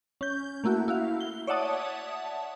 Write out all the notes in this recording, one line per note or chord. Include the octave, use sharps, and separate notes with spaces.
C#4 G6
A3 A#3 E4 F#4
E4 F#4 F5
G7
C#5 D5 E5 F#5 A5 D#6